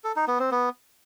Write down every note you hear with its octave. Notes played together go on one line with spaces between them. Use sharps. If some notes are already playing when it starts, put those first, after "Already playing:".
A4
D#4
B3
C4
B3